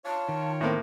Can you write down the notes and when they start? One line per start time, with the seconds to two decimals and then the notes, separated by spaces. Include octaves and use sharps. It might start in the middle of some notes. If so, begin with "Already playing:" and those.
0.05 F4 C#5 A5
0.29 D#3
0.61 A2 A#3 C4